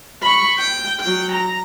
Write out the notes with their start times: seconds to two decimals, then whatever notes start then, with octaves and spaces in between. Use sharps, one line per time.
0.23 B5 C#6
0.58 G5
1.01 F#3 G5
1.32 A#5